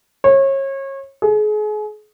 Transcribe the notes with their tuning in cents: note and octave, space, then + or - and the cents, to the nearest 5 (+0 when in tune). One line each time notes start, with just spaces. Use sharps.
C#5 -30
G#4 +35